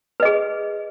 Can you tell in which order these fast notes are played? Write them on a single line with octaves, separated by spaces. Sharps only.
B4 D#5 G#4